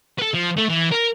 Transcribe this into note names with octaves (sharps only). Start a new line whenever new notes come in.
A4 B4
F3
A3
E3
A#4